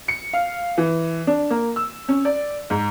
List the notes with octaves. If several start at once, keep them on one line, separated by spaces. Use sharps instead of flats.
C#7
F5
E3
D4
A#3
E6
C#4
D5
G#2